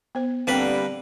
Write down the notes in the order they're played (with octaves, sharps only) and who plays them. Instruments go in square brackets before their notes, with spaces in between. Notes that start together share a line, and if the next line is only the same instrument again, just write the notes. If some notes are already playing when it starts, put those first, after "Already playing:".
[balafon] B3 C5
[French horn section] D3 G3 [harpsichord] A#3 B4 [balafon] C4 G5